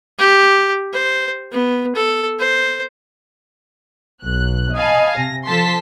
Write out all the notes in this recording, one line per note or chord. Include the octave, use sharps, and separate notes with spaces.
G4
C5
B3
A4
C5
B1 F#6
D#5 F5 G#5 A5 B5
C3 A#6
F3 A4 A5 C6 B6